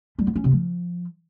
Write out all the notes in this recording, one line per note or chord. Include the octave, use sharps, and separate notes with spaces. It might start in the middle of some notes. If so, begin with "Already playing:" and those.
G3
B3
C#4
C3
F3